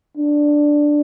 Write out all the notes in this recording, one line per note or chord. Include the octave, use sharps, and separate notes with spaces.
D4